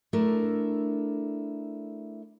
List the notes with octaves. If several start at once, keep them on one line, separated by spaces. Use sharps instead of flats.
A3 D4 E4 A4 A#4